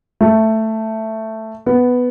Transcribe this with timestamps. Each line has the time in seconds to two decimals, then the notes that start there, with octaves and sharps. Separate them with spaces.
0.21 A3
1.66 B3